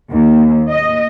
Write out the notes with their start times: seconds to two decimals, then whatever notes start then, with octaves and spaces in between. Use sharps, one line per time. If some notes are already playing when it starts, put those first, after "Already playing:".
0.10 D#2
0.69 D#5